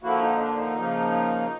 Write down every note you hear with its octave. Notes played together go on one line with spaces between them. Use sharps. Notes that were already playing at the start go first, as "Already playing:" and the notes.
D3 F3 A#3 E4 F#4
D#4
D4
D#4
C#3 F3 A#3